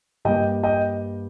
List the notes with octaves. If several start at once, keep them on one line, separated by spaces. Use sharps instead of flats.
G2 G3 A#3 D#5 G5
D#5 G5